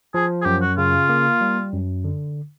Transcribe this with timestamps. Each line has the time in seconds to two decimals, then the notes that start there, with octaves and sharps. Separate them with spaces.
0.14 F3 G#4
0.42 G#4
0.45 F#2 G4
0.62 F#4
0.78 C#3 F4
1.09 A#3
1.41 G3
1.73 F#2
2.04 D3